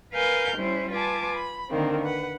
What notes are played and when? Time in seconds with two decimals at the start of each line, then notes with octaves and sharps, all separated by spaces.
0.13 A#4 B4 F5 G#5 F6 G6
0.56 G3 C#4 E4 C5
0.92 F4 B4 G#5 A5 D6
1.34 B5
1.70 D3 D#3 A#3 C4
2.04 B4 F#5